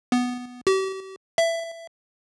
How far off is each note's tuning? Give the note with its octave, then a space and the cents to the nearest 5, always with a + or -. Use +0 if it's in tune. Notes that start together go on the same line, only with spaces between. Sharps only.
B3 +0
G4 -40
E5 +15